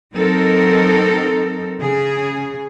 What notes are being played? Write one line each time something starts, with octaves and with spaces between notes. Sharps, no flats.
F#3 C4 D#4 A4 A#4
C#3 G#4